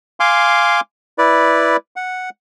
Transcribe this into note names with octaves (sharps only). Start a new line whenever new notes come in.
F5 G#5 C6 D6
E4 B4 D5
F#5